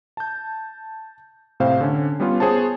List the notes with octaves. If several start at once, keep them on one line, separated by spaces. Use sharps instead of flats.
A5 G6
A2 C3 C4 C5 F5
D3 C#4
G3 B3 C#4 F4
B3 G#4 C5 C#5 A5